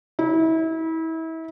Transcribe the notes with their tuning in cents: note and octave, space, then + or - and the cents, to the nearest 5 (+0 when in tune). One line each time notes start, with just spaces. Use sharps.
E4 -30